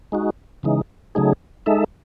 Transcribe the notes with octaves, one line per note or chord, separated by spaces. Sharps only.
G#3 D#4 F#4
C#3 E3 G#3 D#4
C#3 F#3 A3 D#4 G#4
G#3 D#4 A4 E5